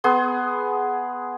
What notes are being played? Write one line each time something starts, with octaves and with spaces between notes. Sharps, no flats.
B3 G#4 C6